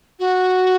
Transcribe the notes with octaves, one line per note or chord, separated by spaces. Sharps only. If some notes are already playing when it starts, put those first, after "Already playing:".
F#4